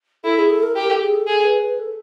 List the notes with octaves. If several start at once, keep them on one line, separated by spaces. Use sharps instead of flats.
E4 A4
G#4
A4
A#4
G4 A#4
A4
G#4
A4
G#4 A4
B4
B4
A4